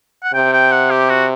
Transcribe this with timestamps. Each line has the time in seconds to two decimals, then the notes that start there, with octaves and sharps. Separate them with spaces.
0.24 F#5
0.34 C3 G5
0.53 G5
0.72 F#5
0.91 G4
1.10 F#4